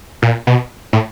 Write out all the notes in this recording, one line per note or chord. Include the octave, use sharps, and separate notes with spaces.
A#2
B2
A2